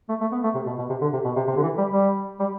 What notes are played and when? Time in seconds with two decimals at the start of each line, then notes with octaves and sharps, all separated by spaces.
0.09 A3
0.21 A3
0.32 B3
0.44 A3
0.55 C3
0.66 B2
0.78 B2
0.90 C3
1.01 D3
1.13 C3
1.25 B2
1.36 C3
1.48 C3
1.57 D3
1.63 E3
1.78 G3
1.93 G3
2.40 G3